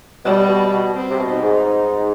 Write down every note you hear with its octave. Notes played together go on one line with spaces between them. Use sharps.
B2 G3
B2
B2
C4
C3
B2
D#4
G#2